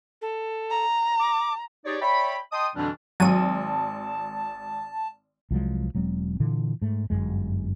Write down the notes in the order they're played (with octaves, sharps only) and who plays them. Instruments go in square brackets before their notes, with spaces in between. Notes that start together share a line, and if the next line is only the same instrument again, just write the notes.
[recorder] A4
[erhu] A#5
[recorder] D6
[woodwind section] D#4 G4 G#4 C#5 D5
C#5 D5 E5 G5 B5
D#5 G5 A5 C6 D#6
F2 B2 D3 E3 G3 D4
[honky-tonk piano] G#1 [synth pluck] F#3 D#7 [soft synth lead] A5
[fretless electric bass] C2 F3 F#3 G#3
E1 F#3 G#3 C4
A#2 D3 E3
G#2 A3
G1 C#2 F#2 G#3